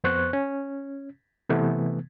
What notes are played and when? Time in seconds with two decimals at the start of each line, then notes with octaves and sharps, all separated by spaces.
0.04 F2 B3 C5 C#6 F#6
0.33 C#4
1.49 C3 E3 A3 B3